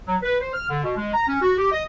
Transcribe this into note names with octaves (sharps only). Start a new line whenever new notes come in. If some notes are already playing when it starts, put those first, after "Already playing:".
F#3
B4
C5
F6
D3
B2
G#3
A#5
C#4
F#4
G4
D#5